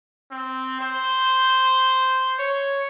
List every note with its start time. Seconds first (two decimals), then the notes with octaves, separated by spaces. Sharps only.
0.31 C4
0.81 C5
2.39 C#5